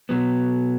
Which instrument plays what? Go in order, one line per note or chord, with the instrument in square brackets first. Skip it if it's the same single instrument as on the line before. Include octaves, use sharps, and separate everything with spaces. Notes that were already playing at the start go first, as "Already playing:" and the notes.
[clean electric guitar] B2 F#3 B3